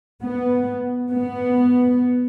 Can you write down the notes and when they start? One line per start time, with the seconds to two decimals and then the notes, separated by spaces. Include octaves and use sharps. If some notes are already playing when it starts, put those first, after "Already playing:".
0.22 B3
1.12 B3